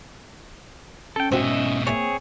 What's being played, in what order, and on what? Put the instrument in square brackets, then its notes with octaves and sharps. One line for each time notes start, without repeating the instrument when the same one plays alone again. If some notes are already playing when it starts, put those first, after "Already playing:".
[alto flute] C#4 [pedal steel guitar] A4 G5
[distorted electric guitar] G#2 B2 [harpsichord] C4 F#4 [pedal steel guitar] D#5 E5
[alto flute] A#3 [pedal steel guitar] C4 G#4 C#5 [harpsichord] D5 E5